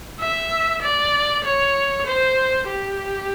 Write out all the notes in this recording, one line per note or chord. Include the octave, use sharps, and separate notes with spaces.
E5
D5
C#5
C5
G4